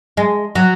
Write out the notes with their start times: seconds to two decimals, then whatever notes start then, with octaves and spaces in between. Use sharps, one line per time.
0.17 G#3
0.55 F#3